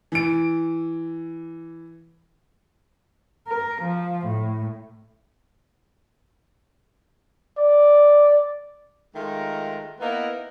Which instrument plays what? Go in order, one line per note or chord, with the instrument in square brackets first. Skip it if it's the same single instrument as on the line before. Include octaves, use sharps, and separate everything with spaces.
[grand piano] E3 D7
[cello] A#4
F3
A2
[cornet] D5
[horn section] D#3 G#3 A3 F4 A#4
A#3 B3 D#4 E4 A#4